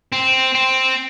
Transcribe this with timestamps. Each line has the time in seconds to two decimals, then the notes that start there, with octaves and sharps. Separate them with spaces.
0.12 C4
0.55 C4